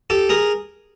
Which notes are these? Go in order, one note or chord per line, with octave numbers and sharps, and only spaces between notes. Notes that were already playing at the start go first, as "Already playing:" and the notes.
G4 A4
G#4 A#4